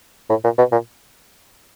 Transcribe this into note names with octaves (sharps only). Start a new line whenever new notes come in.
A2
A#2
B2
A#2